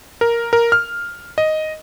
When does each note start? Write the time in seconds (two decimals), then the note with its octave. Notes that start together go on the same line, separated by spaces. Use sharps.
0.21 A#4
0.53 A#4
0.72 F6
1.38 D#5